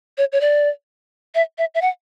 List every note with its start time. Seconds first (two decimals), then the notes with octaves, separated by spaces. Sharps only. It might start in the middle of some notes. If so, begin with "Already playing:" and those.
0.18 C#5
0.32 C#5
0.41 D5
1.35 E5
1.58 E5
1.75 E5
1.82 F#5